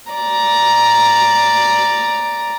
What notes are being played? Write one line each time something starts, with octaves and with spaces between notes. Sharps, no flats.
D5 A#5